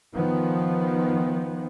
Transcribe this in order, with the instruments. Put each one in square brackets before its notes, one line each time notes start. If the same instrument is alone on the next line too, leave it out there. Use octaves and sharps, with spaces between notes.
[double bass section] D#3 F3 B3